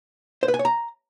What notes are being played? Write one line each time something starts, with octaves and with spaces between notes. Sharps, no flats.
C5
B4
G#5
C#5
A#5